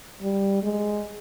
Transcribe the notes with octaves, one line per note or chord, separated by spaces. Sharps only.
G3
G#3